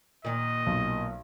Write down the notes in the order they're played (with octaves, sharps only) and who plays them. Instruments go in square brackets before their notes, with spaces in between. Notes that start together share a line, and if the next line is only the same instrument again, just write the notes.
[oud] A#2 D#3 [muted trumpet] D#5
[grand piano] B1